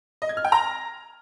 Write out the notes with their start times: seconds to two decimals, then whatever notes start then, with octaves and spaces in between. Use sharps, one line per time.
0.22 D#5
0.29 G#6
0.37 F6
0.45 G5
0.52 A#5